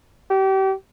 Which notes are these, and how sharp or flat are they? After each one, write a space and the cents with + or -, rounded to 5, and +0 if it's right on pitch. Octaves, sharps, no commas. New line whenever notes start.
G4 -35